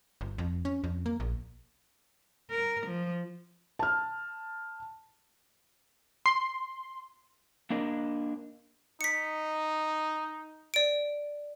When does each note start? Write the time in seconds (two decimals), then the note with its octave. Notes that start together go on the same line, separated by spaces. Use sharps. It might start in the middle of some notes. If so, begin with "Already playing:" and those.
0.21 G1
0.38 F2
0.65 C#4
0.84 F2
1.06 A#3
1.20 A#1
2.50 A#4
2.87 F3
3.79 A5 F6
6.26 C6
7.70 A#3 D4 A#4 D#5
9.01 D#4 B6 C#7
10.74 D5 D7